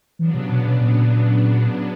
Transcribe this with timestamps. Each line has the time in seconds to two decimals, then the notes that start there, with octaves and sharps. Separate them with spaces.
0.19 C#3 E3 F#3 B3 D4
0.34 C3
0.49 B2
0.65 B2
0.81 A#2